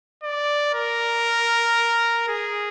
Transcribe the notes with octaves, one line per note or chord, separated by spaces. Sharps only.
D5
A#4
G#4